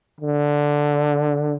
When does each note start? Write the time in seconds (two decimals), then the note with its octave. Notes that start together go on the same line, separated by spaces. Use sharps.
0.21 D3